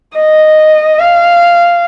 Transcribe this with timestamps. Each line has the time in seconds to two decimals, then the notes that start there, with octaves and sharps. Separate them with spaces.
0.16 D#5
0.99 F5